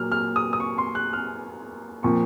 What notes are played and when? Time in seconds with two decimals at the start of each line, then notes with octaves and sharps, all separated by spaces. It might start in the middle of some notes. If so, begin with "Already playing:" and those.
Already playing: A#2 F#3 A#3 F6
0.12 F6
0.36 D#6
0.53 D#6
0.60 C#6
0.78 C6
0.95 F#6
1.13 F6
2.03 A#2 F3 C4 C#6